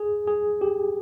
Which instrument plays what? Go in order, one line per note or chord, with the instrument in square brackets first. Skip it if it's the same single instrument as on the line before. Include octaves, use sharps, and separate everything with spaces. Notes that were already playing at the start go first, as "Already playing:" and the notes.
Already playing: [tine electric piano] G#4
G#4
G4